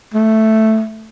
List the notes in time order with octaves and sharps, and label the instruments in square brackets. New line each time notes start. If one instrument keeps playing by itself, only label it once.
[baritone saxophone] A3